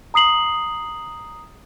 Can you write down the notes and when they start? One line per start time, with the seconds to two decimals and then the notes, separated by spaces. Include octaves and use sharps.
0.14 A#5 D#6 C7 F#7